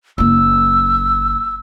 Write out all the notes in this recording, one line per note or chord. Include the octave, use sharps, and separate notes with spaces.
F#1 A#3 E6